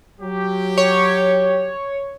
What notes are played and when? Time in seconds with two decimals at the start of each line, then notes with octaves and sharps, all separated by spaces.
0.21 F#3 G4
0.78 C#5